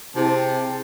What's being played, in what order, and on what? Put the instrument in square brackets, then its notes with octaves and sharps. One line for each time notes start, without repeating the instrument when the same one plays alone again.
[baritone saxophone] C3 [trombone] C4 [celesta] E4 G#4 [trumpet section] A5